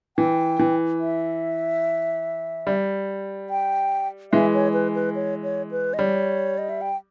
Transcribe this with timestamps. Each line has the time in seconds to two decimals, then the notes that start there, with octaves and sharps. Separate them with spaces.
0.17 E3 G5
0.59 E3
1.00 E5
2.67 G3
3.50 G5
4.32 E3 G#3 E5
4.54 C#5
4.73 B4
4.95 B4
5.15 C#5
5.43 C#5
5.71 B4
5.94 D#5
5.99 G3 C#5
6.58 D#5
6.69 E5
6.81 G5